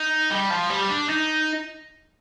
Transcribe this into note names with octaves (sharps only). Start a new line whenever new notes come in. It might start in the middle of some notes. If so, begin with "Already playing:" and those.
Already playing: D#4
G3
F3
G3
D4
D#4